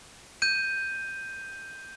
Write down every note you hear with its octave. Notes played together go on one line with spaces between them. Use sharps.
G6 D#7